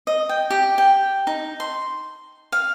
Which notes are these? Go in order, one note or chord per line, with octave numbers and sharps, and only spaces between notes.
D#5
G5
G4
G5
D#4
C6
F5